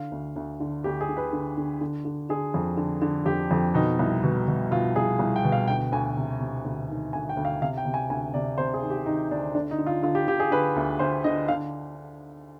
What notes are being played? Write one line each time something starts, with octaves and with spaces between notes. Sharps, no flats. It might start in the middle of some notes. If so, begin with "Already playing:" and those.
Already playing: D3 F5
D2
D2
D3
D2 G4
G#4
D3
B4
D3
D3
D3
D3
D3 G#4
F2
D3
D3
F2 G4
F2
B2 D#4
C2
B2
B2
B2 F4
C2 G#4
C2
G5
B2
F5
D2 G5
D2 G#5
C3
C3
D2
D#3
D2 G#5
G5
D2
F5
C3 F5
G5
C3
G#5
D2 G#5
C3 D5
C3 C5
G#4
D#3
G4
D#3 D#4
D2 D4
D3 D4
D#4
D3
F4
D3 F4
G4
D3 G4
G#4
D3 B4
D2
D2 C5
D3 D#5
D3 F5